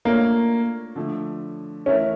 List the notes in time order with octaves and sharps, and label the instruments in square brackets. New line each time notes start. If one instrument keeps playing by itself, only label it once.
[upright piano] A3 D4 F4 A4 C#5 [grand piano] A#3
[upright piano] D3 F3 A3
[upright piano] E3 A3 E4 A#4 E5 [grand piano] C#4